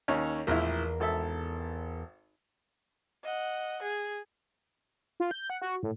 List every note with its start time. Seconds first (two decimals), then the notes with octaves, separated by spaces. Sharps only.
0.08 D#2 C#4 C#5
0.47 A#1 E2 A2 E4 A#4
1.00 G#1 A4 E5
3.24 D#5 F#5
3.82 G#4
5.20 F4
5.31 G6
5.50 F#5
5.62 F#4
5.83 A2